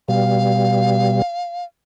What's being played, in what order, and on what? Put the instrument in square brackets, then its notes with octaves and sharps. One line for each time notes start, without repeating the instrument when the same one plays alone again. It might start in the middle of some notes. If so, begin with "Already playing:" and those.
[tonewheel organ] B2 G3 [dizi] F5